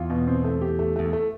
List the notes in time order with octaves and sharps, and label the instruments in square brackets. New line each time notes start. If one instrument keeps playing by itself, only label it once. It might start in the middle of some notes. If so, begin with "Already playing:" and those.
Already playing: [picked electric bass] E2 [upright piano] F4
[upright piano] B2
C4
A3
G4
A3
[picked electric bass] E2 [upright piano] A3
[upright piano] A3